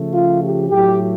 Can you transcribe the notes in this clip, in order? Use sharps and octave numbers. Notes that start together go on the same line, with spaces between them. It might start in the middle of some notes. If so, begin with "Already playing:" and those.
Already playing: C#3 F3 A3
F4
G4
A2 F#3 A3 G4